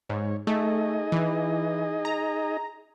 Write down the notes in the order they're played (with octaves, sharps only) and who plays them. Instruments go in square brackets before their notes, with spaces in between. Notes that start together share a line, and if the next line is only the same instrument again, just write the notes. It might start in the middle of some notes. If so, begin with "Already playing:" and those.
[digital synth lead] G#2 [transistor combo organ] C#5
[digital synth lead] A3 [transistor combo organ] D#4 G#4 D#5
[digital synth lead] E3
A#5